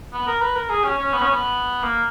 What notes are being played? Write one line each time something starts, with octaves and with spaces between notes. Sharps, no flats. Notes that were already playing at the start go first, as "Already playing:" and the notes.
B3
A#4
B4
A#4
G#4
C#4
C#4
B3
C#4
B3
A#3